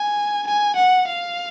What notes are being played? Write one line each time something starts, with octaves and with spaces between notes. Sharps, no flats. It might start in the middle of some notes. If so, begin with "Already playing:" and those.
Already playing: G#5
G#5
F#5
F5